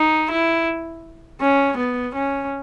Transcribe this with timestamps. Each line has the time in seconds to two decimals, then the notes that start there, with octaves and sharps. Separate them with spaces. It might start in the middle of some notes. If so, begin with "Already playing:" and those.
Already playing: D#4
0.31 E4
1.41 C#4
1.77 B3
2.14 C#4